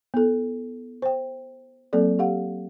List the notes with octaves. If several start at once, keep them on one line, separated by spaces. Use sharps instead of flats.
B3 E4 A4
C5 G5
F#3 A#3 C4 A4 D5
G4 F5 F#5